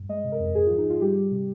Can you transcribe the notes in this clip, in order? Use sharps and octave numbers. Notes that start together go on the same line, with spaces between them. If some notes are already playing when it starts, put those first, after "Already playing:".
Already playing: G2
G#3 D#5
C3
A#4
F2
G#2 G#4
F3 F4
D#4
G#2 F4
G3 G4
G3
C3